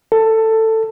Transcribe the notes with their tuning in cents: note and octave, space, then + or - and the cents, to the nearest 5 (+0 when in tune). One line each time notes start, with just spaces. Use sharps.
A4 +15